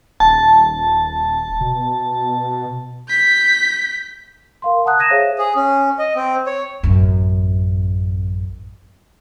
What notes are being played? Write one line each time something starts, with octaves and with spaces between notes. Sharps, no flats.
D#1 A5
B2
G6 B6
A#4 F5 C6
F#5 A5 A#5 D#6 F#6
D#6 G#6 A#6 D#7 E7
G#4 C5 C#5 E5 F5
G#4
C#4
D#5
C4
C#5
A1 F#2